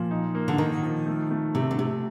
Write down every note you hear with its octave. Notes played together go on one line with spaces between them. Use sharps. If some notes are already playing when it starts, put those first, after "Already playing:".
Already playing: A#2 F3
D#4
A#3
D3
D#3 D#4
F3
A3
A3
C3 A3
D3
C3 A3